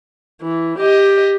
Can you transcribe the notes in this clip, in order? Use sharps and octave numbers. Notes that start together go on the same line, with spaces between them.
E3
G4 D#5